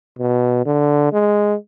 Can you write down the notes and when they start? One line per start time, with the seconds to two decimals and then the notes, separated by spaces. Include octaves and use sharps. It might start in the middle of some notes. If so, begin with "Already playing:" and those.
0.19 B2
0.66 D3
1.13 G#3